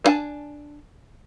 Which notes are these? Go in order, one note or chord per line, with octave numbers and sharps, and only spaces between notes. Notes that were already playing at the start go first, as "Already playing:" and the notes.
B3 D4 F#5 G#5 A5